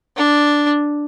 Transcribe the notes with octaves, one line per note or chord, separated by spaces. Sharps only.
D4